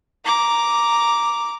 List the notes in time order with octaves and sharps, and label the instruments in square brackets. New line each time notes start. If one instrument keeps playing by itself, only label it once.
[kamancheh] A#5 D6